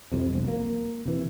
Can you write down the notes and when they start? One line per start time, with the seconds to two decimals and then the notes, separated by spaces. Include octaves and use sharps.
0.12 C2 F2 C3
0.33 E1 B1
0.48 A#3
1.06 C3 E3